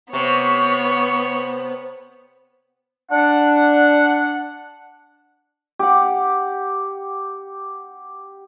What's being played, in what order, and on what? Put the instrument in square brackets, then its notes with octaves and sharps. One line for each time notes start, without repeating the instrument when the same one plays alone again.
[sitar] C3 [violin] B3 [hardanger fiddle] C#5 [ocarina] C#6
[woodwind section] D4 F#5
[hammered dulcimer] G4 F#5